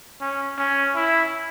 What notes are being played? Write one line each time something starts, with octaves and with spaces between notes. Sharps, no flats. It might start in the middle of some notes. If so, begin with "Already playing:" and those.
C#4
C#4
E4